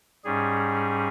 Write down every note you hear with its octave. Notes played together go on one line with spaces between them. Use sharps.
G#2 G3 C#4 G#4